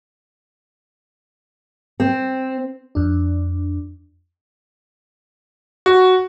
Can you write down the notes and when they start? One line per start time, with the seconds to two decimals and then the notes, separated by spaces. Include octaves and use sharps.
2.00 C4
2.95 F2 D4
5.86 F#4